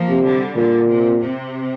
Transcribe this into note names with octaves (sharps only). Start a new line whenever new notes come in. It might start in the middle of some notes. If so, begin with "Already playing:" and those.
Already playing: F3 A#3
C3
D3 G3
A#2 D3
C3
C3